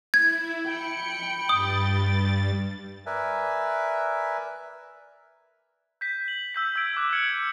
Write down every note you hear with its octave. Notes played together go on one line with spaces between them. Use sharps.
E4 G#6
G5 B5 C#7
G2 D#6 A6
A#4 B4 D5 E5 G#5
G6 B6
F#7
E6 G6 B6
E6 G#6 D7
D6 F#6
F6 G#6 C#7 F#7